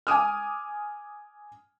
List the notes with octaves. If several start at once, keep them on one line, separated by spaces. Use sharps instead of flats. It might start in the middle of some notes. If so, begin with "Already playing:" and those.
G#5 D6 D#6 F6